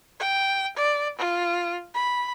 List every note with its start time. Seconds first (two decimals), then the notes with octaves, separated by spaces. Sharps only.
0.19 G5
0.77 D5
1.18 F4
1.94 B5